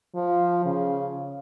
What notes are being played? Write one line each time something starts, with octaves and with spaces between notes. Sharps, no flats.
F3
C#3